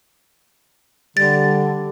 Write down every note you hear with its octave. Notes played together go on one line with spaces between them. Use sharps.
D3 G3 A6